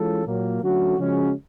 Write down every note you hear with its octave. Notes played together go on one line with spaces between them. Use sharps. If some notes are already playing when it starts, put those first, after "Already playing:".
Already playing: E3 G#3 C#4 F4 A4
A#2 F#3 A#3
D3 F#3 A3 C#4 F#4
C#3 F3 G#3 C#4 F#4